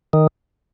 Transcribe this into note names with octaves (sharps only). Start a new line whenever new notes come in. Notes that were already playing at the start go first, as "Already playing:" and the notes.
D#3